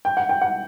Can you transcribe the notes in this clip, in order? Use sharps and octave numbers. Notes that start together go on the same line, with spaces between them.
G5
F#5
G5
F#5